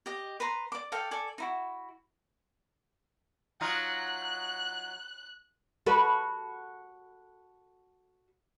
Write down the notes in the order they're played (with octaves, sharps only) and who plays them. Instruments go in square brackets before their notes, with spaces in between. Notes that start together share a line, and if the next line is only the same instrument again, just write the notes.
[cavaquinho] G4 D#5
B4 A#5 C6
D5 D6
A4 D5 F5 G5
A4 D5 G#5
D#4 E4 F#4
[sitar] F#3 D#4 F4 [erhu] F#6
[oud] F#4 A4 B4